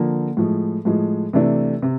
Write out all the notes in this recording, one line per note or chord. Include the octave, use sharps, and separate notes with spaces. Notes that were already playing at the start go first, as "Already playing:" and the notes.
Already playing: D3 F3 A#3
A2 F3 G#3
A2 F3 G#3
C3 E3 A3 D4
C3